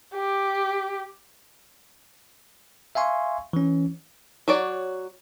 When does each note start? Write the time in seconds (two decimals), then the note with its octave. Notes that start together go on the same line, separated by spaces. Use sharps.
0.14 G4
2.95 E5 F5 G#5 C6 C#6
3.53 E3 C#4
4.48 F#3 F#4 C#5 D5